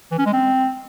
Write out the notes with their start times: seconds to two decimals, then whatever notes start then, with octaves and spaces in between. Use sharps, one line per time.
0.11 E3
0.19 C#4
0.26 G#3
0.33 C4